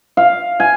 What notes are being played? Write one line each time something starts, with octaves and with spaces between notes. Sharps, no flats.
F5
G#5